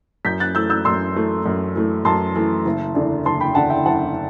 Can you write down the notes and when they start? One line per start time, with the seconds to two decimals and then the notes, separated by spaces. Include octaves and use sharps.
0.25 F#2 G6 B6
0.40 F#6 A6
0.55 E3 A3 E6 G6
0.70 E6 G6
0.85 F#2 C6 E6
1.15 E3 A3
1.46 F#2
1.75 E3 A3
2.05 F#2 A5 C6
2.35 E3 A3
2.66 F#1
2.95 E2 D3
3.25 F#1 A5 C6
3.40 G5 B5
3.55 E2 D3 F#5 A5
3.70 E5 G5
3.86 F#1 F#5 A5